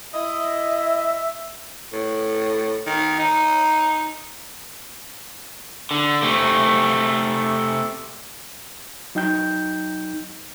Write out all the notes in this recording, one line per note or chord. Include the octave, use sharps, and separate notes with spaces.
E4 D#5 E5
A2
D#3
D#4
D3
C3 A3
F#3 D#4 G5 G6